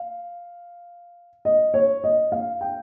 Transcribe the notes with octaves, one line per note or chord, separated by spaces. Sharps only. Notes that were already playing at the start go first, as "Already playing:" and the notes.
Already playing: F5
D#5
C#5
D#5
F5
G5